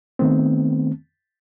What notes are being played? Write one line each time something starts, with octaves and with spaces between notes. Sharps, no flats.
D#3 A3 B3 C4